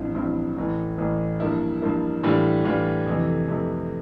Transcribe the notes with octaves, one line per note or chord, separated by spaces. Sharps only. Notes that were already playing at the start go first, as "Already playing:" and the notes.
Already playing: A1 G2 F3 C4 E4
A1 G2 F3 C4 E4
A1 A2 E3
A1 A2 E3
G2 F3 A#3 E4
G2 F3 A#3 E4
A2 E3 G3 D4 F4
A2 E3 G3 D4 F4
F2 C3 E3 A3
F2 C3 E3 A3